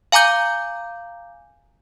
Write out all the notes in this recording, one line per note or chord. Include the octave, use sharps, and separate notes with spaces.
F5 G#5 A#5 D6 G6